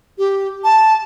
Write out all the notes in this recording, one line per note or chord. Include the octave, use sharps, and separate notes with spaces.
G4
A5